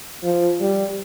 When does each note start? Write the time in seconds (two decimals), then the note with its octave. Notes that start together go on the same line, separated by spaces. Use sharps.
0.24 F3
0.61 G3